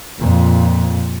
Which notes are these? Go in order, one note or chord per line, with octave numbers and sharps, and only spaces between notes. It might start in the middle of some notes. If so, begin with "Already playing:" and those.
F2 A#2